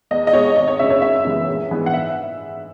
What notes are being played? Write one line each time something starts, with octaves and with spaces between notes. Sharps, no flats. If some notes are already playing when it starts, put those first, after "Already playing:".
E2 D#5
D#5
B2 G#3 C#5
G#1 D#5
C#5
F#2 C#3 E5
C#5
F#2 E5
C#3 E3 G#3 B3
A#1
G#2 E3 B3
F#5
E5